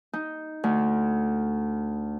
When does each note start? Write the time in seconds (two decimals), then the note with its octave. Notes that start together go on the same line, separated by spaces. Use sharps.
0.13 D#4
0.64 D2